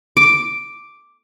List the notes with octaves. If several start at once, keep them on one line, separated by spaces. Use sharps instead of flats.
D6